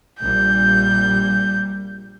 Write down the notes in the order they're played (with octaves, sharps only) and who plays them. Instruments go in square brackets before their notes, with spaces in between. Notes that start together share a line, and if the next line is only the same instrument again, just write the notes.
[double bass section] A#1 A#2 G3 [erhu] G6